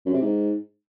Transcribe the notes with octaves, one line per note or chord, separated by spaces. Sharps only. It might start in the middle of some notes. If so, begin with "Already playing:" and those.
F#2
C3
G#2